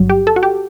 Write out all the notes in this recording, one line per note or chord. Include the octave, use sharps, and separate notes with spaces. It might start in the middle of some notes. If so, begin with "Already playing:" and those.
Already playing: G1 G2 F#3
G4
A4
F#4
G4